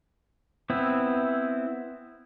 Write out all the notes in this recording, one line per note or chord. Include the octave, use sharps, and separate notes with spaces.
B3 C4 E4